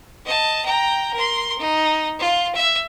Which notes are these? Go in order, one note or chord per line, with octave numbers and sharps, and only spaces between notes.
D#5 A5
G5 A#5
A#4 C6
D#4
F4
E5